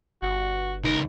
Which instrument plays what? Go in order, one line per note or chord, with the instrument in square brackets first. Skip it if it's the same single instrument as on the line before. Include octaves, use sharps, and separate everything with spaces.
[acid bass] G1 [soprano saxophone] F#4
[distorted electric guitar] C#2 A#4 [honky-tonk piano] D#4